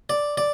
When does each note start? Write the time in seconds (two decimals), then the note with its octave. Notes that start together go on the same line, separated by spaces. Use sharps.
0.10 D5
0.38 D5